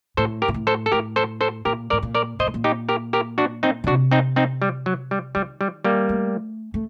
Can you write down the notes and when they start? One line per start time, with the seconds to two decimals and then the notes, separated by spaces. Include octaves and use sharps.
0.17 A2 A4 C5
0.42 G4 A#4
0.48 A#2
0.54 A2
0.67 A4 C5
0.86 A4
0.92 A2 G4 A#4
1.16 A4 C5
1.41 A4 C5
1.65 A#2 G4 A#4
1.90 A2 A#4 D5
2.03 A#2
2.15 A#4 D5
2.39 A#2 C5 D#5
2.47 A2
2.54 A#2
2.64 D#4 G4
2.89 G4 A#4
3.13 G4 A#4
3.38 D4 F#4
3.63 C4 D#4
3.84 D3
3.87 C3 D4 F#4
4.11 C4 D#4
4.36 C4 D#4
4.62 G3
4.86 F#3
5.11 G3
5.35 D#3 G3
5.61 G3
5.84 G3 A#3
6.09 A3
6.74 A3